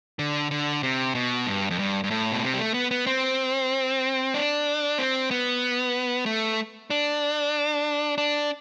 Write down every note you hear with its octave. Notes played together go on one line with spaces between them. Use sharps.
D3
D3
C3
B2
G2
F2
G2
G2
A2
B2
C3
G3
A3
B3
B3
C4
D4
C4
B3
A3
D4
D4